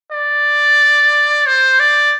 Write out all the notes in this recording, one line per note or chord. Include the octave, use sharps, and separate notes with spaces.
D5
C5
D5